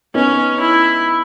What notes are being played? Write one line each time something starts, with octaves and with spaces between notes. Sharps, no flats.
B3 C#4 D#4
E4